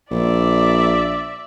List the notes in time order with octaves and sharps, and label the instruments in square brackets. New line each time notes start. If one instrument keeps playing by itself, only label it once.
[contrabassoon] A#1 [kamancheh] D5 E5